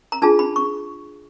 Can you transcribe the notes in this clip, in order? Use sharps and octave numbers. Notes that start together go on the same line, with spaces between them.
A#5
D4 F4 G#4 A5
B5
C#6